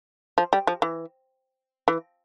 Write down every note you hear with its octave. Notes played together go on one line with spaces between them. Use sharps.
F3
G3
F3
E3
E3